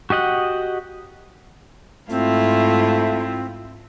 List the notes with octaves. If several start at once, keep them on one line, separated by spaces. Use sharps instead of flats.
F#4 G4 D#5 F#5
G#2 A3 C4 E4 F4